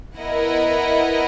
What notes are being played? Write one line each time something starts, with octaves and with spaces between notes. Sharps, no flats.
B3 E4 A#4 D#5 F#5